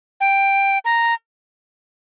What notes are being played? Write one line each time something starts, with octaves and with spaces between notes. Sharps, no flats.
G5
A#5